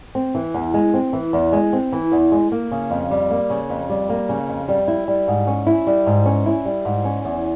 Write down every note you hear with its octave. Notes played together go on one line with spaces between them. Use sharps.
C4
E3
E2
G#3
C4
E3
E2
G#3
C4
E3
E2
G#3
A#3
C#3
F2
G3
A#3
C#3
F2
G3
A#3
C#3
F2
G3
E4
G3
G#2
C#4
E4
G3
G#2
C#4
E4
G3
G#2
C#4
E2